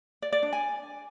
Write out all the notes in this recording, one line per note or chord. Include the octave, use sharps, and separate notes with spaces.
D5
D5
D4
G#5